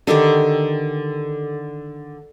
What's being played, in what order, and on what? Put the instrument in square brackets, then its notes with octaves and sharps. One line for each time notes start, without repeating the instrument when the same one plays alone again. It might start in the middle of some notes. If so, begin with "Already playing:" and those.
[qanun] D3 D#3 G4 A4